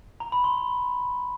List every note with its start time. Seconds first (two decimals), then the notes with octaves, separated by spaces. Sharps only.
0.20 A#5
0.32 B5
0.44 C6